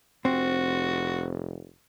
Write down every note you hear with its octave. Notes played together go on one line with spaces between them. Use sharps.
F1 C4 F#4